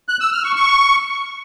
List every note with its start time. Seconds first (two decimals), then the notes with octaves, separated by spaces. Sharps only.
0.09 F#6
0.20 E6
0.32 F6
0.44 C#6
0.56 C#6